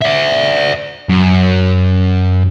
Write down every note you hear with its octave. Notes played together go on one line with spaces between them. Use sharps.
D5 E5
F#2